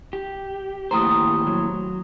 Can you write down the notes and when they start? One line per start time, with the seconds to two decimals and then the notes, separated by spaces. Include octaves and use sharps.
0.13 G4
0.91 D#2 A2 C5 A#5 D#6
1.47 F#3